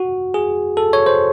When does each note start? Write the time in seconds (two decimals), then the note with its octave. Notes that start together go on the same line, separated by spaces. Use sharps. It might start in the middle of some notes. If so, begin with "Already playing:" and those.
Already playing: F#4
0.34 G#4
0.77 A4
0.93 C#5
1.06 C5